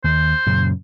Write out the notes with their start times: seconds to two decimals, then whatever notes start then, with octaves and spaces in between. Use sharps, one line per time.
0.04 D#2 C5
0.46 F#2 A#2 C#3